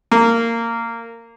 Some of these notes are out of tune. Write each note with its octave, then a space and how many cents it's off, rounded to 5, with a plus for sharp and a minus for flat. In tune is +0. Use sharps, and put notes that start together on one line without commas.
A#3 -15